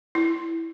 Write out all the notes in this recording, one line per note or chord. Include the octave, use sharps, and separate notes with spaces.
E4